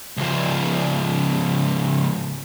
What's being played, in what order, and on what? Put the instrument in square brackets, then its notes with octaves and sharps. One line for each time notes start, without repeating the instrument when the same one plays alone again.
[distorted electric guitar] C#2 F3